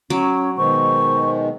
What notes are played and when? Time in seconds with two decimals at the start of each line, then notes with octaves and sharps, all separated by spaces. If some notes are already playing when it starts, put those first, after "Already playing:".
0.10 F#3 C#4 D6
0.57 B2 D#3 G#3 C5 C#6